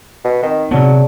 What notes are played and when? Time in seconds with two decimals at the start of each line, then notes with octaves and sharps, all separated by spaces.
0.24 B2
0.43 D#3 C4 D#4
0.71 C3 F#3 B3 G#4 D5 A5